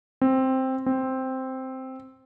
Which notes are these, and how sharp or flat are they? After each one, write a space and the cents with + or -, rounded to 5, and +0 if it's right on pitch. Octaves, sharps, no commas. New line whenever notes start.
C4 +5
C4 +0